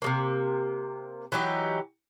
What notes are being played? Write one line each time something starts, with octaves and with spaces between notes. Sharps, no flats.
C3 G#3 A#3
E3 F#3 D#4 G4